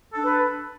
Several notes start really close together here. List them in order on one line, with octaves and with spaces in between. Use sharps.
A4 D4 B4